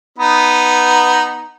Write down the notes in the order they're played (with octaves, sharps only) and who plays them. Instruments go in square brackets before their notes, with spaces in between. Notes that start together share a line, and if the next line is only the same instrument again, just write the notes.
[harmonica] B3 D#4